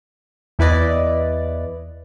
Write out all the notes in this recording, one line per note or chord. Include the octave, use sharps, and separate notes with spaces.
E2 E4 B4 D5 D#5